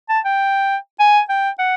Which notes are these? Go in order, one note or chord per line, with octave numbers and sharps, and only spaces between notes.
A5
G5
G#5
G5
F#5